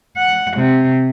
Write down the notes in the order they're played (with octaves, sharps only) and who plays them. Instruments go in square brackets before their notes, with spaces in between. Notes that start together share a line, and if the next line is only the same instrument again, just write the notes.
[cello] F#5
C3